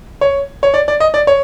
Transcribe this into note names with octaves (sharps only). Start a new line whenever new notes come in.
C#5
C#5
D5
D5
D#5
D5
C#5